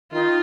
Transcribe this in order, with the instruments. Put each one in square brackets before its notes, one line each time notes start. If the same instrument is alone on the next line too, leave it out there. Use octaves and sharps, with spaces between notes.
[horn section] D#3 D#4 [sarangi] F4